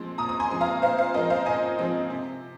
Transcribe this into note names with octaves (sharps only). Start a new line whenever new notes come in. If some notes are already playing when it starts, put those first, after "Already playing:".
Already playing: A#2 F3 G#3 C4 C6
A#2 A#5 D#6
D#6
G#5 C6
F3 G#3 C4 C6
F5 A#5
A#2 C5 F5
C5 F5
F3 G#3 C4 A#4 D#5
C5 F5
A#2 D#5 G#5
F3 G#3 C4
C3